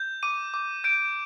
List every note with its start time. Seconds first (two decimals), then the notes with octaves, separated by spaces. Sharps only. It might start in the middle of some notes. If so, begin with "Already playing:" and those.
Already playing: G6
0.23 D6 D#7
0.54 D6
0.84 G6 D7